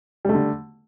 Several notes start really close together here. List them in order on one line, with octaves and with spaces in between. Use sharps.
G3 A3 D3